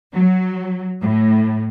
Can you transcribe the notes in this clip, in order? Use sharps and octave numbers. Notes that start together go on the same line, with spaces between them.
F#3
A2